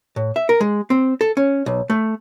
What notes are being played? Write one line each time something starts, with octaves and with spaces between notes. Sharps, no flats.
A2
E5
A#4
G#3
C4
A4
C#4
B1
A3